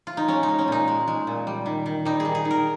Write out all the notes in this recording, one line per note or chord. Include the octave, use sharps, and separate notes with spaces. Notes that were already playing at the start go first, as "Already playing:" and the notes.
F4
D#4
G#3 C#4
D#4
G#3
C#4
A#2 D#4
G#3
G#3
A#2
G3
D#3
D#3
G3 D#4
G#4
D#3
G#4
D#3
A#4